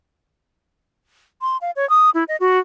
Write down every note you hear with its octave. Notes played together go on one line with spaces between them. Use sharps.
C6
F5
C#5
D#6
E4
D#5
F#4